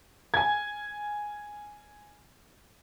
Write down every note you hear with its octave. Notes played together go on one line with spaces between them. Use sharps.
G#5 G#6